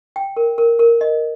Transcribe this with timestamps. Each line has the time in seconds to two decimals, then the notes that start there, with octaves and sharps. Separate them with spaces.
0.16 G5
0.37 A#4
0.58 A#4
0.79 A#4
1.01 D#5